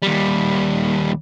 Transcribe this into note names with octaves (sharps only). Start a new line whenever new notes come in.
D#2 G3